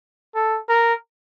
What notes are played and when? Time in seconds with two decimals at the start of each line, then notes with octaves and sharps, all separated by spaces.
0.35 A4
0.69 A#4